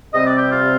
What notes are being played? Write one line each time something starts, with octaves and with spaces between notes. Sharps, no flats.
C3 G3 C4 D#5
D5
G4
F4